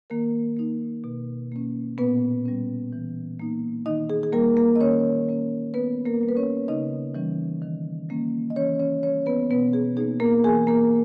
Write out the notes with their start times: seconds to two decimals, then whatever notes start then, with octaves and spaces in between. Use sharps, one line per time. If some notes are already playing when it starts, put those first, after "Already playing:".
0.10 D#3 A#3 A#4
0.57 A#3 D#4
1.04 B2
1.52 A#3 C#4
1.98 A#2 B3 B4
2.45 G3 C#4
2.93 E3
3.40 A#3 D#4
3.86 D#3 D#4 D#5
4.10 G#4
4.23 G#4
4.33 G3 A#3 A#4
4.57 A#3 A#4
4.76 D#5
4.80 D#3 C#4 C#5
5.28 G3 A#3 C#4
5.74 D#3 B3 B4
6.06 A#3 A#4
6.21 G3 A#3
6.29 B4
6.37 C#4 C#5
6.68 C#3 D#4 D#5
7.15 E3 G3 C#4
7.62 D#3
8.09 G3 A#3 C#4
8.50 D#5
8.56 E3 C#4 C#5
8.79 C#4 C#5
9.03 G3 A#3 C#4 C#5
9.26 B3 B4
9.50 B2 B3 B4
9.73 G#4
9.97 D#4 G#4
10.01 A#3
10.20 A#3 A#4
10.44 E3 G#4 G#5
10.67 A#3 A#4